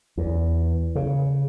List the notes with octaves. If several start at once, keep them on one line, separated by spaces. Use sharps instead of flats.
E2
C#3